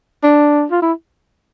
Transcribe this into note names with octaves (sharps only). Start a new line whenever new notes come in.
D4
F4
E4